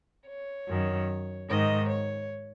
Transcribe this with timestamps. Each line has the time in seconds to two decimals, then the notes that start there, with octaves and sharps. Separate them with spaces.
0.28 C#5
0.69 F#2 D#3
1.50 G#2 D#3 D#5
1.90 C#5